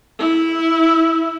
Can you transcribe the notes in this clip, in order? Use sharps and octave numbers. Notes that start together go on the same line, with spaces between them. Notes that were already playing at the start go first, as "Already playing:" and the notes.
E4